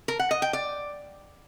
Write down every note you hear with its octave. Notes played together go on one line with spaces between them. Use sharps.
A#4
F#5
D#5
G5
D5